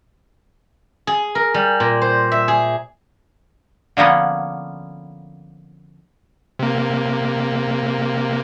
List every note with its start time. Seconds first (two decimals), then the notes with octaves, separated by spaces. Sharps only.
1.07 G#4
1.35 A#4
1.54 G3
1.80 A#2
2.02 C5
2.32 E5
2.48 G#4
3.97 D3 F3 A#3 B3 C#4
6.59 C3 A#3